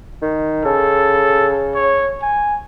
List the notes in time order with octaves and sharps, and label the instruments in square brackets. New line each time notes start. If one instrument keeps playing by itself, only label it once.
[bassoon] D#3
[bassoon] C#3 [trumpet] A4
[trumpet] C#5
G#5